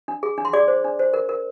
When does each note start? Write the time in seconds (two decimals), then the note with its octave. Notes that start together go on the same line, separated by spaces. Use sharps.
0.08 D4
0.23 G#4
0.38 D4
0.45 C6
0.53 G#4 D5 D6
0.68 C5
0.84 D4
0.99 C5
1.14 A#4
1.29 A#4